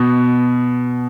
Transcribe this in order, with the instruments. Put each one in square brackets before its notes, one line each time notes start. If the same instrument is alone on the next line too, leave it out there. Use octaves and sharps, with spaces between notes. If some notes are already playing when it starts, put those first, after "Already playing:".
Already playing: [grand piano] B2